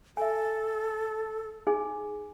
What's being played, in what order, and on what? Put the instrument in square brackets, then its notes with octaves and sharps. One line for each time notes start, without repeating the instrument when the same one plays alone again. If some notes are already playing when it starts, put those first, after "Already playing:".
[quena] A4 [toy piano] E5 G#5
[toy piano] D#4 G#4 G#5